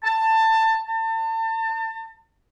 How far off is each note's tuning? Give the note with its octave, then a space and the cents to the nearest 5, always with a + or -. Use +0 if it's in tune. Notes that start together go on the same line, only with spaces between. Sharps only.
A5 +20
A5 +35